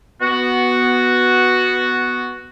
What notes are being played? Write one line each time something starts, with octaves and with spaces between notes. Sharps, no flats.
B3 F#4